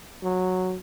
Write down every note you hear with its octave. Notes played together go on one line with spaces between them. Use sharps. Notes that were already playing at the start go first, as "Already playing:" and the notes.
F#3